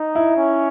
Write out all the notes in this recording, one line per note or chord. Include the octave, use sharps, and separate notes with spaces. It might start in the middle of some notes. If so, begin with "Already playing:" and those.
Already playing: D#4
E4
C#4